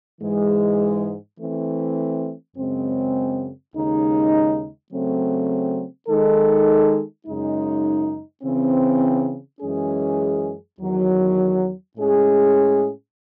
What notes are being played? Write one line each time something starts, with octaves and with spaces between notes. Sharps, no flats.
G#2 E3 G#3
E3 A3 C4
F#2 C#3 G#3 C4
D#2 C#3 G#3 D#4
C#3 F#3 A3 C4
D#3 G#3 D#4 A4
F#2 C#3 G#3 D#4
C#3 E3 C4
F#2 E3 G#3 C#4 G#4
E2 D#3 F#3
A2 G#3 C#4 G#4